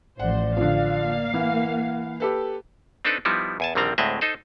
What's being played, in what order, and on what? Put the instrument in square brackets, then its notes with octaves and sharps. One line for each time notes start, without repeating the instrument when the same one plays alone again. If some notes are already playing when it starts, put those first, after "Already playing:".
[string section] A1 F3 C5 [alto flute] D5 [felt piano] F#5
[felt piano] D3 F3 [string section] F5
[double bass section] A#3
[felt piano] E3 [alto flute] F#5
[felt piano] G4 A4 B4
[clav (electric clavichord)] C4 D4 D#4 A4 B4
F3 G3 B3 D#4 E4
E2 G#5 A5
A#1 D3 D#3 G3 C4 A#5
D2 A2 G#3 C4 D#5 E5
D#4 A4 C5 D#5